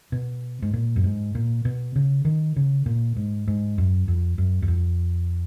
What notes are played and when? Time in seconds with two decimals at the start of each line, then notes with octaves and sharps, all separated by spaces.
0.12 B2
0.62 G#2
0.73 A#2
0.96 F#2
1.04 G#2
1.35 A#2
1.65 B2
1.96 C#3
2.25 D#3
2.56 C#3
2.86 A#2
3.16 G#2
3.48 G#2
3.78 F#2
4.08 F2
4.38 F#2
4.62 F#2
4.68 F2